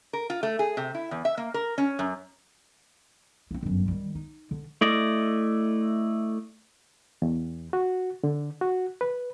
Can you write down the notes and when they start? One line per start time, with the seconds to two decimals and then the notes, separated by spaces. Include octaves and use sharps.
0.13 A#4
0.30 F4
0.43 A3
0.59 G#4
0.77 C3
0.94 E4
1.11 E2
1.25 E5
1.37 A#3
1.54 A#4
1.78 C#4
1.99 F#2
3.51 B3 C4
3.63 G1 F#2
3.88 D#3 G3
4.15 D#4
4.51 D3
4.81 A3 E4 D5 D#5
7.22 E2
7.73 F#4
8.24 D3
8.61 F#4
9.01 B4